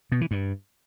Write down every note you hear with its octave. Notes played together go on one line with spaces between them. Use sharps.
B2
E3
G2